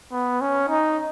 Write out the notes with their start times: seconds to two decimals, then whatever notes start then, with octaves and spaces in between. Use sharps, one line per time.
0.12 B3
0.41 C#4
0.69 D#4